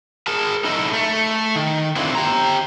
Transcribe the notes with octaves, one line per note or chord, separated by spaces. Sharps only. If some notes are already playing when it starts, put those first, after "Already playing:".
G#4 A#4 A5
D#4 E4 A4 D#5
A3
D#3
C4 D4 E4 F4
G4 A#5